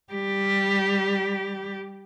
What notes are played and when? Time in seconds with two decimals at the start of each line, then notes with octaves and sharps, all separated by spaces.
0.13 G3 G4